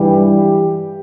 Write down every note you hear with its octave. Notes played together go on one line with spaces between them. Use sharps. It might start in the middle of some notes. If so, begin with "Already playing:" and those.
Already playing: G2 E3 G3 G4